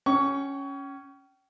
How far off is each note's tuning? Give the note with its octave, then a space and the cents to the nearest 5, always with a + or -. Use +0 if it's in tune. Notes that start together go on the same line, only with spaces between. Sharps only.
C#4 +0 G5 -30 C#6 +25